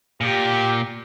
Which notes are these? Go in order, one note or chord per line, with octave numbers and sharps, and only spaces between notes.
A#2 G4